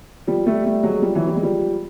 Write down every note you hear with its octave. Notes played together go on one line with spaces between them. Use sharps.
F3 G3
G3 A3
G3 A3
F#3 G#3
F3 G3
E3 F#3
G3
G#3
F3 G3